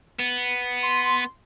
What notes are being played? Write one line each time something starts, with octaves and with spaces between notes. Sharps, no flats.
B3
C6